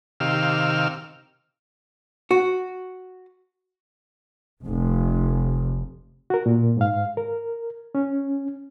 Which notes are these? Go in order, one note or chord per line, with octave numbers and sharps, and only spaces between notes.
C3 D#3 G4 F5 E6 F6
F#4
F1
F#4 A#4
A#2
G#2 F5
A#4
C#4